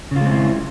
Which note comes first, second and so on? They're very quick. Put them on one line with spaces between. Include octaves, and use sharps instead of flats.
C#3 F4 G#3 C4 E4